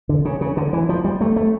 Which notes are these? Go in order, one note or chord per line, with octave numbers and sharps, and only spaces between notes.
D3
C#3
C#3
D3
E3
F3
G3
A3
A3